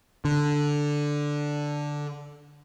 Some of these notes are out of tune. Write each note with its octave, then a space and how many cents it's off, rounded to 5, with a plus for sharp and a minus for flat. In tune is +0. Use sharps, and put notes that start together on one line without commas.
D3 +0